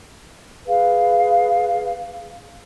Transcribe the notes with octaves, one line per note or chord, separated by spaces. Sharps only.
G#4 B4 F5